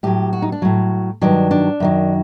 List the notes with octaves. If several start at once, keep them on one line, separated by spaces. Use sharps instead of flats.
A2 F#3 G4
F#4
D#4
D4
A2 F#3
G2 D#3 F#3 D4
D4
F#2 D#3 F#3